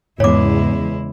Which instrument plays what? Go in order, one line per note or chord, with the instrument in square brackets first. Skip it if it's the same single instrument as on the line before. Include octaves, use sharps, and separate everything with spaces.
[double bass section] E2 C#3 [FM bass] G#2 [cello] G#3 E4 [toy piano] C#5 D6